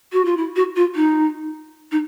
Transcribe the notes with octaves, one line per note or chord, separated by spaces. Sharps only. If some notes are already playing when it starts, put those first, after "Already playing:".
F#4
F4
E4
F#4
F4
D#4
D#4